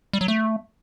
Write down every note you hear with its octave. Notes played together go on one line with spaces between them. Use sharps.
G3
F#3
A3